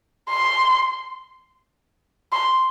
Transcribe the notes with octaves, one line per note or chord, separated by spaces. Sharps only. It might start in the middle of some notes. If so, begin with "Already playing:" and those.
C6
C6